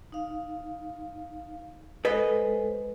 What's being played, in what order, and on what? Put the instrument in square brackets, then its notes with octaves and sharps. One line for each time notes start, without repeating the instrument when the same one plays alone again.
[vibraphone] D#4 F5
[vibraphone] G#3 A4 C5 [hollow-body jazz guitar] B4 D#5